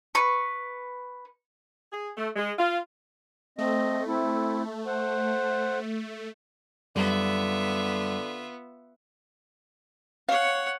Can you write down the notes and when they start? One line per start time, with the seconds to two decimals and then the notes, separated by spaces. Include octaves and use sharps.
0.15 B4 C#6
1.93 G#4
2.17 A3
2.36 G#3
2.59 F4
3.58 A3 C4 D#5
4.07 C4 E4
4.86 C5 F#5
6.96 F#2 D3 G3 B3 F4 E5
10.29 C#5 F5 F#5